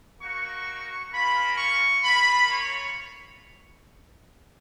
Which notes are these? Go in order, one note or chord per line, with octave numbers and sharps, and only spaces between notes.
A#3 D#4 F#4 C#6
A#3 C#4 F4 B5
C#6
A#3 F4 B5
C#5